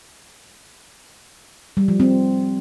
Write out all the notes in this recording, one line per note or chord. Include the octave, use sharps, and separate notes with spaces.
G3
F3
C4